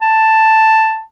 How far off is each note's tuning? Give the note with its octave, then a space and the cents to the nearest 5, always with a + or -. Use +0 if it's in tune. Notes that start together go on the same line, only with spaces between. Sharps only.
A5 +5